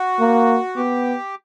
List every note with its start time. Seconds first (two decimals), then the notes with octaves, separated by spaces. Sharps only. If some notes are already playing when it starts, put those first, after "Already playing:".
Already playing: F#4
0.20 A#3
0.76 B3 G4